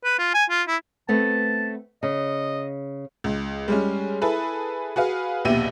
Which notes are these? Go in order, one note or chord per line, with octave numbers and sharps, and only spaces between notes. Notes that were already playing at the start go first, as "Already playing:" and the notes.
B4
F4
G#5
F4
E4
A3 B3 C4 A5
C#3 D#5
C#2
G3 G#3 C#4
E4 G#4 A4 B4 B5
F#4 G#4 B4 F5
A#1 D#2 B2 G4 E5 D#7